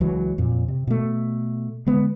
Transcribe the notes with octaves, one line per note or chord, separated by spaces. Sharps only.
C#2 E3 F#3
F2 A#2
C3
B2 A3
D3 G#3 B3